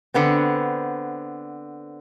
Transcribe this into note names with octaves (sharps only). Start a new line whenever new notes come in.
D3 B3 C4